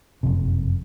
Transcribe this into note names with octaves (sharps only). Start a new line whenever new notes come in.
F#1 F2 C3